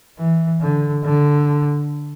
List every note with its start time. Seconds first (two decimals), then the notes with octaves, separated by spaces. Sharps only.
0.19 E3
0.61 D3
1.04 D3